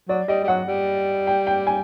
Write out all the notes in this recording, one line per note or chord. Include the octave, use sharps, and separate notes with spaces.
F#3 D5
G3 D#5
G3
F#3 F#5
G3
G5
G5
G#5